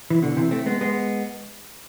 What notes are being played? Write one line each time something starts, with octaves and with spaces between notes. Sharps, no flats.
E3
B2 D3
C3 E3
A3 C4
G#3 B3
G#3 B3